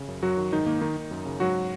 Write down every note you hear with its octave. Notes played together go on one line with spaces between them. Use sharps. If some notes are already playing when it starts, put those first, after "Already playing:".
Already playing: C#3
F#2
F#2 F#3 F#4
D#3
G#2 D#3 D#4
D#3 A#3
D#3 D#4
D#3
F#2
C#3
G#2 F#3 F#4